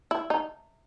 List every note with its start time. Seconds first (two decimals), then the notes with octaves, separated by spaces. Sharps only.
0.11 E4
0.30 D#4